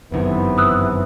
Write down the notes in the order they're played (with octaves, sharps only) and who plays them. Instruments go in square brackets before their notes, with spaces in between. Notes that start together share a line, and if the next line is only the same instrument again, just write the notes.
[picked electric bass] G1 F#2 D#3 [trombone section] C3 E3 B3
[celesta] D#6 E6 F#6